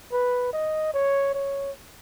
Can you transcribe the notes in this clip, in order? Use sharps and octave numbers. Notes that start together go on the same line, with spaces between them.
B4
D#5
C#5
C#5